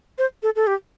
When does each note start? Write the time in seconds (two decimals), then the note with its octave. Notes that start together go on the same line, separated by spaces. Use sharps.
0.18 C5
0.43 A4
0.56 A4
0.67 G4